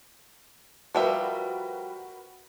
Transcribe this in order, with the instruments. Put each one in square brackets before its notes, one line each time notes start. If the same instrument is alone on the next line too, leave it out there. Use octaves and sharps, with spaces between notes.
[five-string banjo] F3 G3 E5 [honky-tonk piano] F#4 A#4 B4